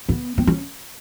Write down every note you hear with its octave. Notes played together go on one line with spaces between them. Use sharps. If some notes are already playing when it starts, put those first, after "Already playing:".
B3
C4
C#4